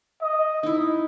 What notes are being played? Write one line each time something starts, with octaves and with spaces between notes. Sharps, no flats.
D#5
D#4 E4